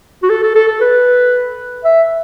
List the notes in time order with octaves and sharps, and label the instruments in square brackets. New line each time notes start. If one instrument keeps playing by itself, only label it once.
[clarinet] F#4
A4
A4
A4
A4
B4
E5